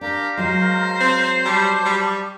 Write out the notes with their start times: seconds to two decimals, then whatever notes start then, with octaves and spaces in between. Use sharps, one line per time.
0.01 D4 G4 A#4 F5 A#5
0.37 F#3 G#3 C5
1.00 C4
1.45 G3 A5 C#6 D6
1.86 G3